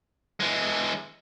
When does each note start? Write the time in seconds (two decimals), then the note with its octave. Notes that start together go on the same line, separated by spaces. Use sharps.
0.40 E3 G#3